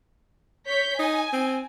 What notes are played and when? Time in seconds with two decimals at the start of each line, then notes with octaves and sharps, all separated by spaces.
0.67 C#5 G6 B6
0.99 D#4 G#5
1.33 C4